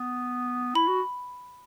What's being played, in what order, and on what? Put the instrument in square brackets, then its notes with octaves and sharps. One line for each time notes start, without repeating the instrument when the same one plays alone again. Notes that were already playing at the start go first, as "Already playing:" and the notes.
Already playing: [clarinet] B3
[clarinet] E4 [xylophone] B5
[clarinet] F#4